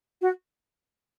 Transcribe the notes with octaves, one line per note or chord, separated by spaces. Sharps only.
F#4